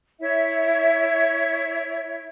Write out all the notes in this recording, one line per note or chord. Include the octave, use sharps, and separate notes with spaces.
E4 C#5 E5